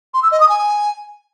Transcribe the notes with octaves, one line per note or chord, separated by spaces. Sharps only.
C6
E6
D#5
D#6
G#5